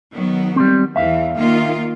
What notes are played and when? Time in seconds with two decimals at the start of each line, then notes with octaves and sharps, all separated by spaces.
0.14 D#3 F#3 B3
0.56 G3 C4
0.96 E2 E3 E5 F5
1.35 D#3 A#3 F4